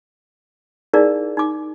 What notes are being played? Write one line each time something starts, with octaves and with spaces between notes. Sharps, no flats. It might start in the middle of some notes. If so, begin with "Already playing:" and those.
D#4 E4 G#4 A#4 D5 F5
D#4 D6